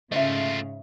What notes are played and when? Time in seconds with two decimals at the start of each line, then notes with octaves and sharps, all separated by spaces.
0.12 G#2 C#3 A3 F4 D#5 E5